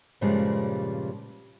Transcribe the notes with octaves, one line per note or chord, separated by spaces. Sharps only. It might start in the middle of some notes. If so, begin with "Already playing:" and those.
G2 A#2 C#3 F3 G3 G#3